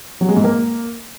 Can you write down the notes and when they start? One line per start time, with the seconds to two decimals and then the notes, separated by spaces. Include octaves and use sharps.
0.21 F#3
0.29 G#3
0.36 G#2
0.44 A#3